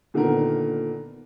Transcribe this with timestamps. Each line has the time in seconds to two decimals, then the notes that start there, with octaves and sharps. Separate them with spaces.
0.14 A#2 D3 D#3 B3 A#4